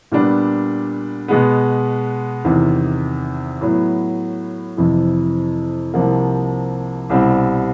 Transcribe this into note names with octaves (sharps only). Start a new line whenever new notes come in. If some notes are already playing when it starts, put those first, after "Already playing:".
A#2 G3 B3 D4
B2 G#3 B3
E2 C3 D#3
A2 F#3 B3
F2 C3 E3
C2 C3 F3 A#3
C2 B2 G3 C4